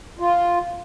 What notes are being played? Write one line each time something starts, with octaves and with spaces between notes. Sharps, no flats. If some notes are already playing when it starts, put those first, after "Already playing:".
F4